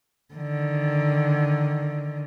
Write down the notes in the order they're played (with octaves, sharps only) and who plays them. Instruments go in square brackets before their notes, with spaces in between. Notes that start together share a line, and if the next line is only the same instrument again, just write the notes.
[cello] D3 D#3